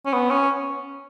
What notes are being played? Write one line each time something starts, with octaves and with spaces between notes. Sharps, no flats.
C#4
B3
C#4